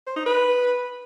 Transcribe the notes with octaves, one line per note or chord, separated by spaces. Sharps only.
C5
D#4
B4